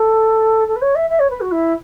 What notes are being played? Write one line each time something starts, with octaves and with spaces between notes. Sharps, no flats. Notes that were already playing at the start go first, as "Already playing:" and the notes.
Already playing: A4
A4
B4
C#5
E5
E5
C#5
B4
F#4
E4